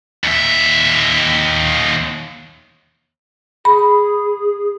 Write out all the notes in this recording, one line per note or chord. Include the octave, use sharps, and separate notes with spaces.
D#2 E5
G#4 B5